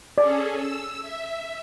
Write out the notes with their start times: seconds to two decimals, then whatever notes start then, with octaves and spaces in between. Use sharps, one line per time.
0.18 C#4 G#4 A4 D5
0.55 E6
1.02 E5